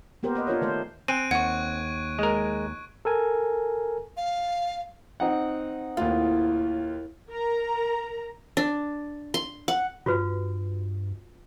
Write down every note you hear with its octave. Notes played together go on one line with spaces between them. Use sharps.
A#3 B3 G4 A#4 C5
B4 C5 D#5
D4 F4 A#4 C#5
D#3 A3 C5
C4 G#5 F#6 D7 D#7
D#2 F#5 C#6 G#6
G#3 A#4
A4 A#4 G#5
F5
C4 D#4 F#5
D#2 A2 F4
A#4 A#5
D4
C6
F#5
G2 F4 F#4 B4